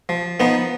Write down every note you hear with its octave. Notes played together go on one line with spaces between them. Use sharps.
F3
F3 B3 D#4